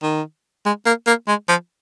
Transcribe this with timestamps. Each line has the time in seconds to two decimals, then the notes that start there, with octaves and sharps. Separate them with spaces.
0.03 D#3
0.65 G#3
0.86 A#3
1.07 A#3
1.28 G#3
1.48 F3